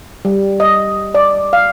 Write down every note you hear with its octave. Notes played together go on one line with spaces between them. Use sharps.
G3
D#5
D5
F5